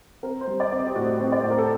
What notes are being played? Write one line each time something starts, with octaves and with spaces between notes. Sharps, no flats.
C4 A#4
C5
G3
D5
C4
D#5
G4
A2 F#4
C4
D5
A2 C5
A#4
A4